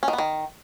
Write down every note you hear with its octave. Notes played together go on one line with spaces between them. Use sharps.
C#4
D#3
B3
D#3